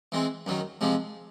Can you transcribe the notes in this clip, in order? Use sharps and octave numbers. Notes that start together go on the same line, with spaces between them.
E3 G#3 C4
F#2 D#3 F#3
C3 F3 G#3